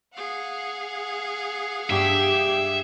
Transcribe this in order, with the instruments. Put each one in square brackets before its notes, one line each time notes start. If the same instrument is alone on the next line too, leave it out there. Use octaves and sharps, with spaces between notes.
[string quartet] G#4 F5 F#5
[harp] G2 [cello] G4 [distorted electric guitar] E5